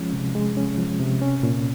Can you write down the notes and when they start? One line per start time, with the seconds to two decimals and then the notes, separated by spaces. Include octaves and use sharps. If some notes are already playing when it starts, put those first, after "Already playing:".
Already playing: F3 G#3 C#4
0.13 C3
0.35 G#3
0.57 C#4
0.78 F3
1.00 C3
1.22 C#4
1.43 A#2